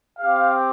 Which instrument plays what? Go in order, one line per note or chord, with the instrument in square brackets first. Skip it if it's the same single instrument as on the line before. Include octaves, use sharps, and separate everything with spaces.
[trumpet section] C4 G4 F5